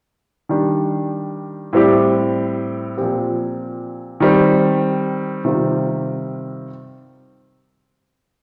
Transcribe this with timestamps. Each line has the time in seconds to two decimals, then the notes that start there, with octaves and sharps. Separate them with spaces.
0.49 D#3 G3 D4 G4
1.73 A2 G3 C4 G4 D5
2.97 A#2 F3 C4 G4
4.20 D#3 G3 C4
5.45 C3 D#3 G3 C4 F4